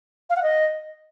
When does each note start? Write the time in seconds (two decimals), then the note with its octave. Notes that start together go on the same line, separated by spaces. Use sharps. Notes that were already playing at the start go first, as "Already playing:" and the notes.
0.30 F5
0.36 F#5
0.42 D#5